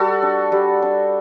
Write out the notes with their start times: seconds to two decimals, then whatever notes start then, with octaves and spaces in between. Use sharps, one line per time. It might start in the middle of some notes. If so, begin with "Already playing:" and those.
Already playing: G3 F#4 A4
0.22 D4
0.52 G3
0.82 D4